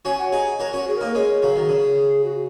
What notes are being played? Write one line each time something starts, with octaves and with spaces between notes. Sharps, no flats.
C#4 F#4 G#5
F#5
D#4 G#4 G#5
F#4 A#4 C#5
C#4 F#4
C#5
G#4
A#3 D#4 A#4
G#3 C#4 G#4
C#3 F#3
D#3
C#3
F#4